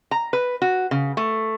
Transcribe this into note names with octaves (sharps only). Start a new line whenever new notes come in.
A#5
B4
F#4
C#3
A3